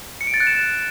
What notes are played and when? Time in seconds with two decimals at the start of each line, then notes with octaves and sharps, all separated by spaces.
0.21 C#7
0.27 D7
0.34 A6
0.40 F#6
0.47 E7